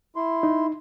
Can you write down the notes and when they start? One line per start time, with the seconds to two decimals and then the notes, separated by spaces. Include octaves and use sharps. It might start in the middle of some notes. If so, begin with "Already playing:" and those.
0.16 E4 C6
0.43 D#4